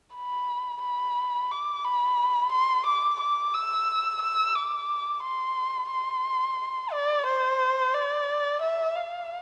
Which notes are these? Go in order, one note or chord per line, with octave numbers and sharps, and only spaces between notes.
B5
B5
D6
B5
C6
D6
D6
E6
E6
D6
C6
C6
D5
C5
D5
E5
F5